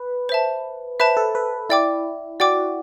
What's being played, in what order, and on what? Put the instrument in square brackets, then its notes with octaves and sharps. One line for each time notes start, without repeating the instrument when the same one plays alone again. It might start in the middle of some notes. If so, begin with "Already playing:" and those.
Already playing: [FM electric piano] B4
[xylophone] C5 E5 A5
[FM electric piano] B4 [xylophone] C5 E5 A5
[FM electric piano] A4
B4
[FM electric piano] E4 [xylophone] D5 G5 D6
[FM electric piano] F#4 [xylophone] D5 G5 D6